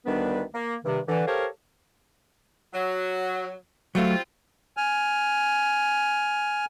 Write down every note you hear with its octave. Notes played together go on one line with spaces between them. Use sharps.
D2 D#3 G3 B3 D4 B4
A#3
G2 C3 D#3
D3 E3
G4 A4 A#4 C5 C#5 F5
F#3
F#3 G3 A3 C4 F4
G#5 F6